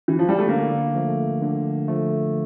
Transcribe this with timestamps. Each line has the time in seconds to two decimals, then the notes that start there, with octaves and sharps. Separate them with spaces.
0.08 E3
0.19 F3
0.29 G3
0.39 A3
0.49 D3 A#3
0.95 F3 A3
1.42 D3
1.88 F3 A3